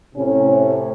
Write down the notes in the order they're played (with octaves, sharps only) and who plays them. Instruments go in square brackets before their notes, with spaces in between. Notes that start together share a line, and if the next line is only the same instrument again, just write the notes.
[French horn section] A2 C3 C#4